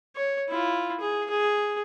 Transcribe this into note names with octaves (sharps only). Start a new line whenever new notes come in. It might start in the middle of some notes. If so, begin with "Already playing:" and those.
C#5
E4 F4
G#4
G#4